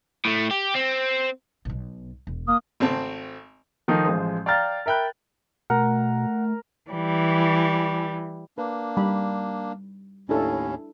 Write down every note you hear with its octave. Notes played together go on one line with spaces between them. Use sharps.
A2 A3
G4
C4
B1 B2
E1
A#3 D#6
G#1 A3 C4 A5
D#3 F3 A3 D#4
A1 F3 G#3 C5 D#6
D5 F5 G5 A#5 F6 A6
A#4 E5 G5 B5 F#6
B2 A3 A#4 F#5
E3 G3
A#3 D4 B4
G3 D#4 B5
D#2 A2 C#4 D4 E4 A4